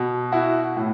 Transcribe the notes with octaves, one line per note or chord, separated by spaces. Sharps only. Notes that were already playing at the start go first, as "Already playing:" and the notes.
Already playing: B2
E4 F#4
A2